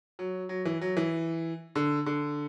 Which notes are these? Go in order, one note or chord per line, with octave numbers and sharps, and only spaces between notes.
F#3
F#3
E3
F#3
E3
D3
D3